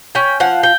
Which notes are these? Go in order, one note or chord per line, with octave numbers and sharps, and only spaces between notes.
C#4 G5
F3 F#5
G5